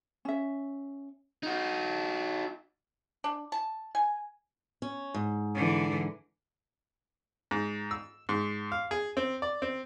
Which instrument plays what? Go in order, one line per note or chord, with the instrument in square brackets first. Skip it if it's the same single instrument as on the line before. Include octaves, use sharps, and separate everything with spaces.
[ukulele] C#4 E5
[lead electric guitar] D#4 F#4
[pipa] D4
A5
G#5
[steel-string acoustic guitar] C#4
G#2
[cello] D3 E3
[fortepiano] G#2
E6
G#2
F5
G#4
C4
D5
C4